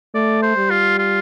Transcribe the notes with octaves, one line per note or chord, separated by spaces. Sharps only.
A3 D5
C5
G3
F4
F4